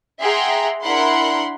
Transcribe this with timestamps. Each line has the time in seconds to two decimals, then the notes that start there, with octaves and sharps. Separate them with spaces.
0.21 G#4 E5 F#5 G5 A#5 C6
0.82 D4 E4 A#4 F#5 B5 C6